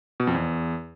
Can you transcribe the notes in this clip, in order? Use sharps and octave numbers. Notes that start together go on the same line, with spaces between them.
B2
F2
E2